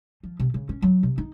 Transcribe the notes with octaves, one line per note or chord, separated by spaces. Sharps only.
F3
C3
C#3
C#4
F#3
C3
D#4